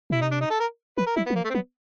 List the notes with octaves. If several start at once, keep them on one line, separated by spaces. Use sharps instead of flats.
B2 E4
C3 D#4
D4
D#4
A4
A#4
F3 B4
A#4
F#3 E4
B3
F#3
F3 A#3
A3
C4
F#3 B3